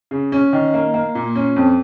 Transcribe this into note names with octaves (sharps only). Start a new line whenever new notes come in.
C#3
C#4
D#3
A#3
A#3
A#2
C#4
F2